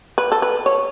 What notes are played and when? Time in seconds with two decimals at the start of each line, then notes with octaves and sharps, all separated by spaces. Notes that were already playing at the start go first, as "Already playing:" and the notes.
0.18 B4
0.32 A4
0.42 B4
0.66 C#5